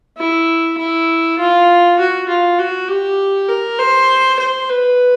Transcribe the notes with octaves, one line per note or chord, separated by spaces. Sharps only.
E4
E4
F4
F#4
F4
F#4
G4
A#4
C5
C5
B4